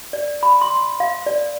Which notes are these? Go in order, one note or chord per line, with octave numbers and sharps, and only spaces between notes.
D5
B5
C6
F5
D5